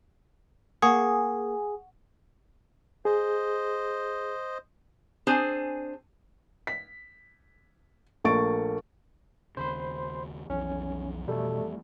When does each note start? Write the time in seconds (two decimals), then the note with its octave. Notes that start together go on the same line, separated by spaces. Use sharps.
0.82 A#3 G#4 F#5 C#6
3.05 G#4 C5 D#5
5.27 C4 D4 G#4 C5 G#5
6.67 B6
8.24 A#1 A3 A#3 C#6 A6 D7
9.57 D#2 C#3 C5 B5 C6
10.50 B1 F2 E3 C#4
11.28 B2 G3 A3 A4